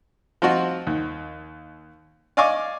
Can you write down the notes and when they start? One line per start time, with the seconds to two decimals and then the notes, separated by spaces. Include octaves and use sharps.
0.42 F3 C4 D#4 F4 F#4
0.87 D#2
2.37 D5 D#5 F5 G#5 C#6 D6